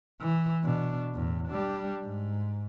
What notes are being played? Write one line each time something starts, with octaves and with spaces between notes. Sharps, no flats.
E3
B2 D4
E2 A2
G3 D4
G#2